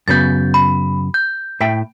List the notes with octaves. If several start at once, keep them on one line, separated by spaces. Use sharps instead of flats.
F#2 C#3 B3 G6 A6
B5
G6
A2 E5 G5